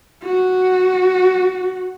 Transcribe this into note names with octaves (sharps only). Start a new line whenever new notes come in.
F#4